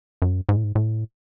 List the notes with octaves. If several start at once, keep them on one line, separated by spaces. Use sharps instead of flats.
F#2
G#2
A2
G#2
A2